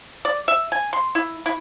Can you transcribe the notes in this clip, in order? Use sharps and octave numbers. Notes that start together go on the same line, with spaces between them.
D5
E5
G#5
C6
E4
E4